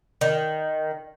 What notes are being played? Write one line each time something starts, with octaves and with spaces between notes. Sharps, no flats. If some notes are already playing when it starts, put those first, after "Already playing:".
D#3